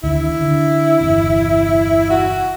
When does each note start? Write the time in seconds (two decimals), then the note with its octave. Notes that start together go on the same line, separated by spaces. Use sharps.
0.03 D2 D3 D#3 E4
0.41 D3
1.00 G1 E2 C3
2.10 F#4